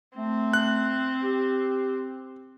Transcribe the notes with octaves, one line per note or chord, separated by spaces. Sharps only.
A3 C4
F#6
G4